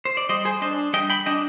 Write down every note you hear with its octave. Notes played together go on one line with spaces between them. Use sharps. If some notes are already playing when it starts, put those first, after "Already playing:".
C5
D5
G3 C5 D#5
G#4 C5
D4 C5 D#5
G3 D#5 G5
G5 B5
D4 D#5 G5